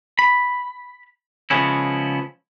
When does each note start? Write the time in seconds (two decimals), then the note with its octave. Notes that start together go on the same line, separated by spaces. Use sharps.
0.19 B5
1.50 C#3 F3 G#3 B3 C#4 E4